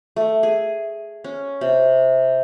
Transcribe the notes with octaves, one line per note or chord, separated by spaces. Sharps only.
A3
G#4
C#4
C3